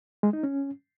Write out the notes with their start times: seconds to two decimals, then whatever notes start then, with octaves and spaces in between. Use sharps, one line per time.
0.23 G#3
0.33 D#4
0.43 C#4